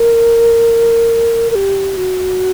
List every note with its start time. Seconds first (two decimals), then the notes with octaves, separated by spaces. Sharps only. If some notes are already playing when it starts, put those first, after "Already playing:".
Already playing: A#4
1.51 A#4
1.55 G4
1.97 F#4